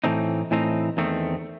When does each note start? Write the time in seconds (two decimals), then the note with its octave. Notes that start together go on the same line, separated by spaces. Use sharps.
0.04 A2 E3 A3 C4 D#4
0.51 A2 E3 A3 C4 D#4
0.97 E2 D#3 A3 C4